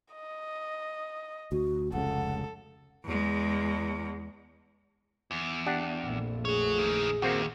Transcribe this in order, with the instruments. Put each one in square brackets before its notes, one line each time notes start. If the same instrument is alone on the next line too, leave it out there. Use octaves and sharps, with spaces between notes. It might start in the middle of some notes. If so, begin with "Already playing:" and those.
[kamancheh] D#5
[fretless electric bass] D2 [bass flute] F#4
[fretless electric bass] F1 C#2 C#3 [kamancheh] A4 [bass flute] F#5
[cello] E2 G#3
[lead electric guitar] E2
[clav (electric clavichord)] D4 G4 F#5
[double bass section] A#1 F2 A3
[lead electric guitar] F#4 C#5 [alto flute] G#4
[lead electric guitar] D#3 E3
[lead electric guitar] D#2 [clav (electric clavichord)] A#3 C4 F#4